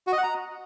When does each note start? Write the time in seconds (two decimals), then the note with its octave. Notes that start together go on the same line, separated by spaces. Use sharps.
0.07 F#4
0.13 D#5
0.18 F#5
0.23 A#5